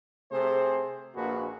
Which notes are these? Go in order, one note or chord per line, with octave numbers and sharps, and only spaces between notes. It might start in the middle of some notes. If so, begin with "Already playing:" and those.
C3 A3 G#4 C5
A#1 A#3 D4 F#4 G#4 B4